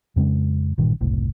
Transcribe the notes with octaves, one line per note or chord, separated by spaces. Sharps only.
F2 C#3 G#3 C#4
A1 G2 A#2 D#3
F#1 C2 A2